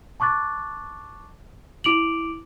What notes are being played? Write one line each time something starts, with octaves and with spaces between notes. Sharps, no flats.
A5 C#6 D6 F#6 A6
E4 D6 D7 F7 F#7